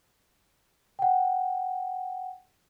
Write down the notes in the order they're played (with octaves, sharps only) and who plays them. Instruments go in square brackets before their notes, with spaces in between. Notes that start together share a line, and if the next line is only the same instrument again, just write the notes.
[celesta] F#5 G5